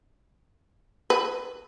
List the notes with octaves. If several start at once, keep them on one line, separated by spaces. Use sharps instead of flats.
B4